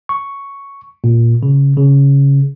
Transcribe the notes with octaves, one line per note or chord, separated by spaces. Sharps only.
C#6
A#2
C#3
C#3